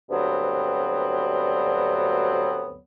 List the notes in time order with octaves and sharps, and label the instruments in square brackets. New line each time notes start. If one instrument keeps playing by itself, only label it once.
[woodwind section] D2 G2 F#3 B3 C4